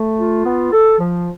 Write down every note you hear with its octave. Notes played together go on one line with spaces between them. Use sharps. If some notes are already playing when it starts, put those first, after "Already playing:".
Already playing: A3
F4
B3
A4
F3